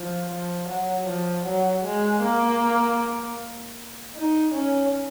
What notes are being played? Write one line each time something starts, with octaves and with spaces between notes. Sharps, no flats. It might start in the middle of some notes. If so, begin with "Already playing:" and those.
Already playing: F3
F3
F#3
F3
F#3
G#3
A#3
D#4
C#4